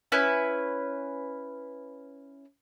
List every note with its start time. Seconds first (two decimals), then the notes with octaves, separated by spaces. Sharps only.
0.12 C#4 E4 B4